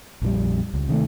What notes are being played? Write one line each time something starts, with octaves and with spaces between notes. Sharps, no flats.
A#1 F2 D3 G3
C#2
C3 D#3 G#3 A3